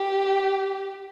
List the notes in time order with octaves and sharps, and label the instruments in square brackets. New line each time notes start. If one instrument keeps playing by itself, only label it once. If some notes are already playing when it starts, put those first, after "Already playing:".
Already playing: [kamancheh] G4